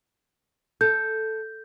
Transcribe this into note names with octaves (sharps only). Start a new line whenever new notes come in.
A4 G6